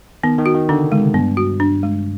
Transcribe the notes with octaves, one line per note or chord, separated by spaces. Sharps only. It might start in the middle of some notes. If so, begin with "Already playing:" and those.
D#3 B3
D#3
F#4
D#3
D3 D4
C#3
G#3
C3
G2 B3
F#4
D4
G#3